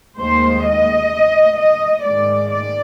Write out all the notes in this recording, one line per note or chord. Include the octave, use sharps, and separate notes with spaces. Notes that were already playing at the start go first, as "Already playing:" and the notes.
D#2 D#3 G#3 C5
D#5
D#5
G#2 D#3 G#3 D5
D5